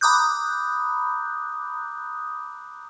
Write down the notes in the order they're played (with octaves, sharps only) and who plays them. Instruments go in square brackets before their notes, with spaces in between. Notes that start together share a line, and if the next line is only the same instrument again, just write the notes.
[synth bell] A#5 B5 D6 D#6 F#6 G6